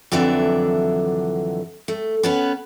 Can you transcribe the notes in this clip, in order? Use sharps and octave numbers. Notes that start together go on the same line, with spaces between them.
F2 D3 E3 F#3 D4 E5
A3
B3 C#4 B4